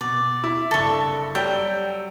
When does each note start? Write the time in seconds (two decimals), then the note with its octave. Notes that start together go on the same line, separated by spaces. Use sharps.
0.01 B2 D5
0.44 E4
0.71 F#1 G2 A4 C#6 G7
1.35 F#3 G3 G5 E6